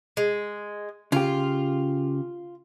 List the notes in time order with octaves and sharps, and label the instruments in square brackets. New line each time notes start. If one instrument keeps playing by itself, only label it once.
[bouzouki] G#3
[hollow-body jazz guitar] C#3 G4 [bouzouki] F4